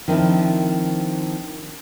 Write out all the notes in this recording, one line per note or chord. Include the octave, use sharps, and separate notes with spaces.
D#3 F3 C4 D4 E4